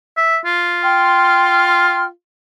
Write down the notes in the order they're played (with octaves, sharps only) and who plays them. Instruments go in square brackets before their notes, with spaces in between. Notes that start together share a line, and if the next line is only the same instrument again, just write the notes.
[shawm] E5
F4
[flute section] G5 C6 F6